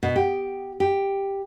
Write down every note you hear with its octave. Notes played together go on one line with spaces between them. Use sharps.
B2
G4
G4